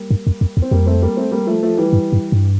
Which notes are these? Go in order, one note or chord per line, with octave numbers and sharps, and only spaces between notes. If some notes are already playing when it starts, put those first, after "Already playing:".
Already playing: G3 A#3
G2
F2
F2
E2
C4
F2 G3 A#3
A3 C4
G3 A#3
A3 C4
G3 A#3
F3 A3
F3 A3
E3 G3
G2
G2
G2